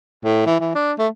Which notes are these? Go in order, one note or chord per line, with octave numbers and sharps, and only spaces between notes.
A2
E3
E3
D4
A3